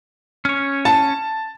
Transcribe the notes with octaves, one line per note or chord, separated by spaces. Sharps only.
C#4 C#5
A5